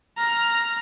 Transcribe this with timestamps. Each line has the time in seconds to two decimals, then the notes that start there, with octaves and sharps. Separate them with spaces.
0.18 A#5 F6